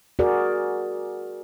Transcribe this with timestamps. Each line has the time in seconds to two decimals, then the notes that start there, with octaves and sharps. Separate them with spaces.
0.19 F#4 G#4 A#4 D5